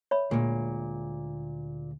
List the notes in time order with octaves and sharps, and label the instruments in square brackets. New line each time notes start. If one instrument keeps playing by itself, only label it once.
[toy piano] C#5 E5 B5
[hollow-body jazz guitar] D2 G#3 [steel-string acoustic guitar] A#2